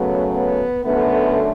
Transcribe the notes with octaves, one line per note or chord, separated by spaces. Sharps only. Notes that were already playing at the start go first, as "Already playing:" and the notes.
Already playing: F#2 C#3 F#3 A3 B3
B3
F#2 D3 A3 B3